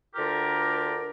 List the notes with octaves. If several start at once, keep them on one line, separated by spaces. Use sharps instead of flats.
D2 D3 F4 G4 A#4